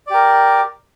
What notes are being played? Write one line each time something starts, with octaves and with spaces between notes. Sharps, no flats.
G4 A#4 D5